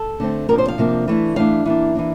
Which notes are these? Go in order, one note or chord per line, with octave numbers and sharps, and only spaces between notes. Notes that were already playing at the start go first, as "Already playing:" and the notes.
Already playing: A4
D3 A3 C4
C3 F3 A#3 D4 A#4
C5
F5
C3 F3 A#3 D4
E3 A3 D4
E3 A3 D4 F5
E3 A#3 D4
E3 A#3 D4